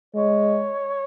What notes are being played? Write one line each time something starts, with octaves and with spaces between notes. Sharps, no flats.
G#3 C#5